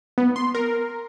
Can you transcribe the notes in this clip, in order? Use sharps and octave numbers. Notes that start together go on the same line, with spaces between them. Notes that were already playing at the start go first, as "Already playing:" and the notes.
B3
C6
A#4